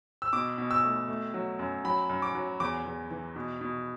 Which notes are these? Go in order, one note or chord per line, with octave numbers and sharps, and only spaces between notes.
E6
B2 D6
B2
E6
A3
A3
F#3
F#2
F#3 B5
F#2
D6
F#3
E2 D6
E2
E3
B2
B2